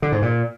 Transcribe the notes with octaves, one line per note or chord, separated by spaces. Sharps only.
D3
G#2
A#2